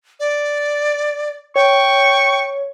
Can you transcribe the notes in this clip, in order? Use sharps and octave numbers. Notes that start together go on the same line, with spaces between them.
D5
C#5 G5 C#6